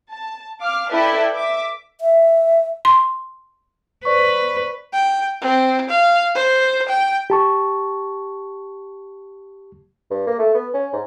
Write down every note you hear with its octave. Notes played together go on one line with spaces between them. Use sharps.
A5
F5 D6 F6
E4 A4 B4 D5 E5 G5
E5 D6
E5
C6
B4 C5 D5 C#6
G5
C4
F5
C5
G5
G4 A5 C#6
G2
A#3
A3
B3
C#4
G#2